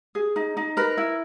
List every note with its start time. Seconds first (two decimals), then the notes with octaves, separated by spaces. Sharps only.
0.15 G#4
0.36 D#4
0.57 D#4
0.77 A#4 B4
0.97 E4